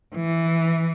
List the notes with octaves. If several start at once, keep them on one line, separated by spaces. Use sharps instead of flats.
E3